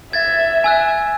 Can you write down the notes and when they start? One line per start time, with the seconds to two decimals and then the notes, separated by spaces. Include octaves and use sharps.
0.13 E5 G#6 A6
0.64 G#5 E6 F#6